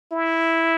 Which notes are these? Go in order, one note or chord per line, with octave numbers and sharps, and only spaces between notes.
E4